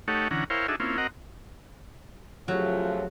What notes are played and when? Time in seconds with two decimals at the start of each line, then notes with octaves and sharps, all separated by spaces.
0.08 A3 D#4 G4 A4 C#5 F#5
0.31 D3 E3 C#4 F#5 A#5
0.50 E4 A#4 C5 C#5 F5 G5
0.68 D4 D#4 F#4 G#4 A4 E5
0.80 A#3 C4 C#4 E4 F4
0.98 C4 F#4 A#4 D#5 F#5 A#5
2.48 C#3 F3 F#3 A3 F4 G4 G#4